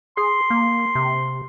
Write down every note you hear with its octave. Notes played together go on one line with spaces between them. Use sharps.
G#4 C6
A#3
C3